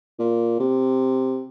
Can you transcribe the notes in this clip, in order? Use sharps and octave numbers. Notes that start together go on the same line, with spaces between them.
A#2
C3